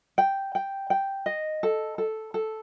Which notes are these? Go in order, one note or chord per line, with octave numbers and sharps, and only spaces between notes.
G5
G5
G5
D#5
A4
A4
A4